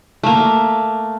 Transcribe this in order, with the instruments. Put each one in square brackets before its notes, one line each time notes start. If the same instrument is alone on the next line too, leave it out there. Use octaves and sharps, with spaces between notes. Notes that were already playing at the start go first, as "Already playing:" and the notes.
[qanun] A3 A#3